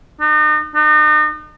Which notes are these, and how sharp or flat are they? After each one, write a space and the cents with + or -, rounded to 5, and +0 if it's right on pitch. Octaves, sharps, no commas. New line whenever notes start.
D#4 -40
D#4 -40